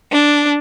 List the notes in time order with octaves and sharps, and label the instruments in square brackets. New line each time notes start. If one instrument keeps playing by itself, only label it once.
[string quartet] D4